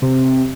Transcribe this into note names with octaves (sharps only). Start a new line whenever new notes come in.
C3